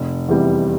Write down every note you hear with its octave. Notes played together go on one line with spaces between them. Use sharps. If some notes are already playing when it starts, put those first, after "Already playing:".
Already playing: F1
E2 C3 E3 G3